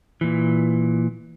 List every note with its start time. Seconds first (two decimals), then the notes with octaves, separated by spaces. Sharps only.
0.21 A#2 E3